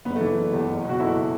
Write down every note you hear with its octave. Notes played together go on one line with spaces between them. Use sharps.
F#1 B3
A3
E3
F#1
E2
F#1
B2 F#4
F#1 E4 A4